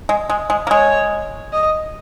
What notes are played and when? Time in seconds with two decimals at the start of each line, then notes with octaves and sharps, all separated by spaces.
0.09 G#3
0.30 G#3
0.50 G#3
0.67 A#3
0.70 G#3 C#5
1.53 D#5